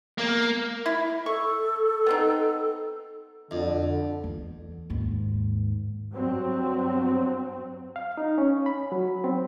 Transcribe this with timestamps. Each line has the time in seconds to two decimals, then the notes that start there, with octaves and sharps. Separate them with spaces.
0.18 A#3
0.86 E4
1.26 A4 C#6
2.07 B3 C4 D#4
3.51 F2 D3
4.24 E2
4.90 D#2 G#2
6.12 G2 F#3 C4
7.96 F5
8.18 D#4
8.38 C#4
8.66 B5
8.92 F#3
9.24 C4